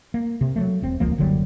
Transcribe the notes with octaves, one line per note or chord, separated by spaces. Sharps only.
A#3
C3
F#3 G3 A3
E1 C4
D#1 C#2 F3 A#3
F#1 D3 F#3 G3